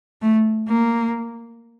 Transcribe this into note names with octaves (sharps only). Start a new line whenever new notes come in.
A3
A#3